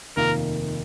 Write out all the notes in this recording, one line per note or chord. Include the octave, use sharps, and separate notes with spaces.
F1 D#2 D#3 A#3 F4 A#4